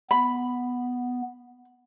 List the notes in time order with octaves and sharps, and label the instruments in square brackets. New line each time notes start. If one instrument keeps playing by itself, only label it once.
[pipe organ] B3 [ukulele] B5